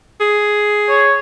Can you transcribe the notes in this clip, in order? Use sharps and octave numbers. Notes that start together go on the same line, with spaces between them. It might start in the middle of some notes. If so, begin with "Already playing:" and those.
G#4
C#5